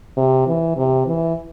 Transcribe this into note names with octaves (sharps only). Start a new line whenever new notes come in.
C3
E3
C3
E3